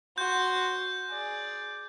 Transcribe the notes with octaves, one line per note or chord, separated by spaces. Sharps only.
F#4 C6 G6
G#4 D5